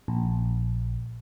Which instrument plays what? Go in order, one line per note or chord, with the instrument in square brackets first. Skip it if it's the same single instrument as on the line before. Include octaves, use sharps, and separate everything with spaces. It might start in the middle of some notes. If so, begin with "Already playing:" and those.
[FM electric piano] A#1